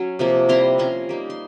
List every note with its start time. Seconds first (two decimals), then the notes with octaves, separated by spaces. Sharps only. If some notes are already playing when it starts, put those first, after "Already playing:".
Already playing: F#3 C#4
0.19 C3 F3 A#3
0.49 G3 C4 E4 A#5 C6
0.78 F3 A#3 C#4 A#5 C6
1.09 G3 A#3 D#4
1.30 C6